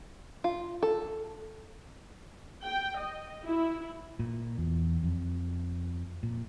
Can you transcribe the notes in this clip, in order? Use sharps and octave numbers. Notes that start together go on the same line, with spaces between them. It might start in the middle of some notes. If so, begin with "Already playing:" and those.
F4
A4
G5
D#5
E4
A#2
E2
F2
A#2